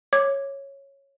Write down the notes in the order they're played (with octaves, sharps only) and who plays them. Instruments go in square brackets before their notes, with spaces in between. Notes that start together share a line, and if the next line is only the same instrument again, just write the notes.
[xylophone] C#5 D6 G#6